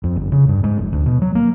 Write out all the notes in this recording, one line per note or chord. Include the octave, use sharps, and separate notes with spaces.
F2
G1
C#3
G2
G#2
F1
D2
B2
F#3
A#3